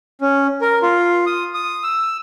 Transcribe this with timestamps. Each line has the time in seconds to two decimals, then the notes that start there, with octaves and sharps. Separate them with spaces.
0.21 C#4
0.61 A#4
0.82 F4
1.26 D#6
1.54 D#6
1.83 E6